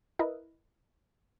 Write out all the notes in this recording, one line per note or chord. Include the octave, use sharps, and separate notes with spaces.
E4 A#4 B4 D#5